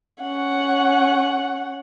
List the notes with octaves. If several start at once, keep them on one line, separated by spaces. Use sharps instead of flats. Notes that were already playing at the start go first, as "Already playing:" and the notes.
C#4 F#5